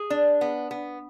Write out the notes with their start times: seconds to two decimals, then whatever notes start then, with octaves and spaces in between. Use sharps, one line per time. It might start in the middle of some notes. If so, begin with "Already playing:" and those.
Already playing: G#4
0.10 D4
0.41 B3
0.71 B3